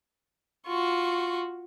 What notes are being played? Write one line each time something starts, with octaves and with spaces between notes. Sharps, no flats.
F4 F#4 C#6